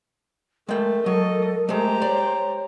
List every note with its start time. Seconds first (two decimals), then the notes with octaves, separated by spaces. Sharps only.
0.69 G#3 A3 A#4 G5
1.06 F#3 A4 D#5
1.69 G#3 A3 G4 C5 A#5
2.02 C#5 D5